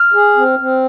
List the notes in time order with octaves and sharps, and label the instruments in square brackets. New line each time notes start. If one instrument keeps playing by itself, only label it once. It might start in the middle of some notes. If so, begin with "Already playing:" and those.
Already playing: [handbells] F6
[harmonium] G#4
C4
C4